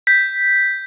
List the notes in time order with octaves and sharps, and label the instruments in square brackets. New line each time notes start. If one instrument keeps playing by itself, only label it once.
[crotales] G6 B6